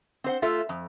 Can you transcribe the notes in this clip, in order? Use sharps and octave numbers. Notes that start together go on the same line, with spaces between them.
C4 C5 F#5
A3 F4 A4 E5
F2